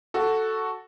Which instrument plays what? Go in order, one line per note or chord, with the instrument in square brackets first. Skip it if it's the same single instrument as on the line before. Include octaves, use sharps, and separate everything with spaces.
[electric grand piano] F#4 A4